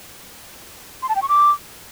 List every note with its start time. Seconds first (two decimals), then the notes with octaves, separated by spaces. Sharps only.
1.02 C6
1.09 A5
1.16 G5
1.22 C#6
1.29 D6